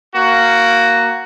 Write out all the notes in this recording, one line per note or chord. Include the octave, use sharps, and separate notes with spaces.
A#3 F#4